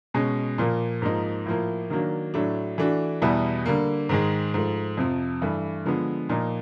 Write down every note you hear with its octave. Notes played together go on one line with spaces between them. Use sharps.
B2 G#3 C#4
A#2 F3 A#3
G#2 F3 A#3 D#4
A2 F3 A#3
D#3 F#3 A#3 D4
A2 F#3 A3 D4
E3 A3 D4 F#4
E2 B2 G3 B3 E4
D3 G3 A#3
G#2 D#3 G#3
G#2 F3 A3
F2 C3 F3
G2 E3 A3
D3 F3 G#3 B3
A#2 F3 A#3 D#4